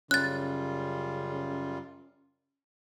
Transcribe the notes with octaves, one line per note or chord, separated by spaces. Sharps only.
F#2 C#3 G3 C#4 F4 F#6 A6